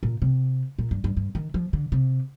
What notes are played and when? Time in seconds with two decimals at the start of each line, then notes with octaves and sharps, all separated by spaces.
0.03 A#2
0.22 C3
0.78 A#2
0.91 G2
1.04 G2
1.17 G2
1.35 D#3
1.54 F3
1.73 D3
1.92 C3